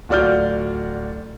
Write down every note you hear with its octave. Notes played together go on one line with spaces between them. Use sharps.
D1 F4 F#4 D5 F6 G6